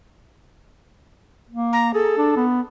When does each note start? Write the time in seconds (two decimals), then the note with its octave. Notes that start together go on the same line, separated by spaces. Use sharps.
1.50 A#3
1.73 A#5
1.94 G#4 A4
2.17 D4
2.36 B3